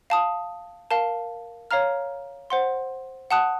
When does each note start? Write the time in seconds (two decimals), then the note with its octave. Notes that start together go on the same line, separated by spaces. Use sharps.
0.10 F5 A5 D#6
0.91 A#4 F5 A5
1.71 C#5 F5 A#5 F6
2.50 C5 F#5 C6
3.31 F#5 A5 D#6 F#6